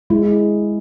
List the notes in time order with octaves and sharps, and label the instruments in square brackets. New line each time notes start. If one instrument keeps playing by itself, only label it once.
[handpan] G#3 [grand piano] E4
[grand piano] E4